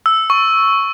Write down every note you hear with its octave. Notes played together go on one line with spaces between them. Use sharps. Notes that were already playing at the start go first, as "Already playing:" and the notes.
E6
C#6